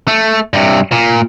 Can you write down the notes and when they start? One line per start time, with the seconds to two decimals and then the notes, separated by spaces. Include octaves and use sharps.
0.08 A3
0.53 G2 C3
0.92 A#2